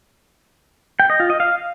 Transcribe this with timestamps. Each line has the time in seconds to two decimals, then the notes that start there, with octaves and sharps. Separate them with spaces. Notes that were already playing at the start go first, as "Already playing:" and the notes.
1.00 G5
1.10 D#5
1.20 F4
1.30 D#5
1.40 F5